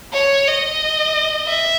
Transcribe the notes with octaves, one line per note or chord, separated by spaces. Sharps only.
C#5
D#5
E5